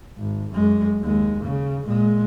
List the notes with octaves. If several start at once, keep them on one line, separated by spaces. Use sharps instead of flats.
G#1
F#2 G#3
D#2 G#3
C#3
A#2 G#3